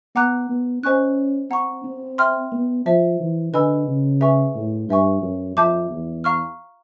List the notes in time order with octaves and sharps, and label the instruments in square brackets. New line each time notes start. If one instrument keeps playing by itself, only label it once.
[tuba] B3 [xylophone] F#5 A#5 D6 F#6
[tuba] B3
[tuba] C#4 [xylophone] C5 D#5 G#5 C#6 F#6
[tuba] C4 [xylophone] F#5 A#5 C#6
[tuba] C4
[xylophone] E5 G5 C6 F6
[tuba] B3
[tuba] F3 [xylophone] C5 E5 A5
[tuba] E3
[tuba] D3 [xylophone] B4 D#5 G#5 B5 E6
[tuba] C#3
[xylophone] G#4 B4 E5 G#5 C#6
[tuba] A2
[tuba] G2 [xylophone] B4 E5 G#5 C#6
[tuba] F#2
[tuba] F2 [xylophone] E5 A5 D6 G6
[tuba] E2
[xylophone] F5 A#5 C#6 F6